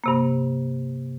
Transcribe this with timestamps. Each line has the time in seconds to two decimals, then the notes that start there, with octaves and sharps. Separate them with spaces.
0.04 G2 C3 A#3